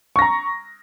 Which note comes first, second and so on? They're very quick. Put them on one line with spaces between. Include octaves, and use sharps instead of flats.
C#6 A#6 A#5